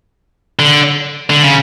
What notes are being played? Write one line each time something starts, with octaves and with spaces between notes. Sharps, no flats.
D3
D3
C#3